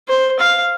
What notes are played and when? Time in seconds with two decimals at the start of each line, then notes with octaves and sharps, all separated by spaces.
0.08 C5
0.39 F5